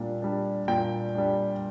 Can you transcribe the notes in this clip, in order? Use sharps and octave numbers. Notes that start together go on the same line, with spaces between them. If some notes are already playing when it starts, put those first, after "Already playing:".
Already playing: A#2 G3 D4
G3 D4
A#2 G5
G3 D4